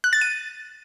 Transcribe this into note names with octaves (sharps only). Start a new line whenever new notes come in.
F#6
A6
D#7